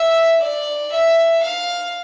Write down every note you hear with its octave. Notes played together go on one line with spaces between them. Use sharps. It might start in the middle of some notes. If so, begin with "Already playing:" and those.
Already playing: E5
D5
E5
F5